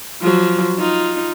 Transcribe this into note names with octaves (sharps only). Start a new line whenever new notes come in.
F3 F#3
D#4 F4